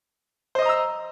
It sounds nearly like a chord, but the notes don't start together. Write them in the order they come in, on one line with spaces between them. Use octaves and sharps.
C5 D#5 D#6 A#5 E6